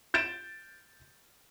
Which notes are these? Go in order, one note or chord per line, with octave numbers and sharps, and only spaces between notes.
G6 A6 D7 E7